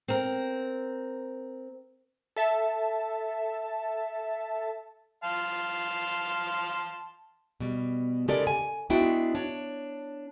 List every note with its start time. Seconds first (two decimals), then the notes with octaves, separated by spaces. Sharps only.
0.08 C4 A#4
2.36 A4 E5 A5
5.24 F5 A5 C6
7.60 B2 G3
8.28 C#3 G#3 G4 A4 A#4 D5
8.47 G#5
8.90 G#3 B3 D4 E4 F#4 G5
9.35 D4 C#5